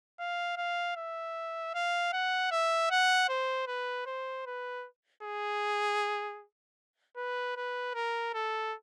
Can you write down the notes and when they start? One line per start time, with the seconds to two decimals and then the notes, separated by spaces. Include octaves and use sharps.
0.19 F5
0.57 F5
0.96 E5
1.74 F5
2.12 F#5
2.51 E5
2.91 F#5
3.29 C5
3.67 B4
4.06 C5
4.46 B4
5.23 G#4
7.17 B4
7.57 B4
7.94 A#4
8.34 A4